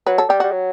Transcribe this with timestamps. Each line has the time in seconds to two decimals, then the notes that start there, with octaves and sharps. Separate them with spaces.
0.07 F#3 B4
0.18 A4
0.29 G3 G4
0.40 G3 F#4
0.51 F#3